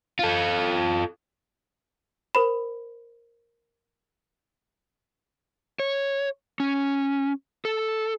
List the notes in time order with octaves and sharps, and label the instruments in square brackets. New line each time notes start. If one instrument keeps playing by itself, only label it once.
[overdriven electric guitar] F4 A4
[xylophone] A#4 C5 B5
[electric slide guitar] C#5
C#4
A4